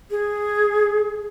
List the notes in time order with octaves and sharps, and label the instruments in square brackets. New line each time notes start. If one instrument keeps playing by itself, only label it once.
[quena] G#4